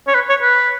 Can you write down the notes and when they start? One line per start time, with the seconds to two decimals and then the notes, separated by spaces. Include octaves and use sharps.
0.07 C#5
0.15 B4
0.29 C#5
0.42 B4